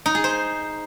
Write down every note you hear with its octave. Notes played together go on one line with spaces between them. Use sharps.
D#4
G#4
C5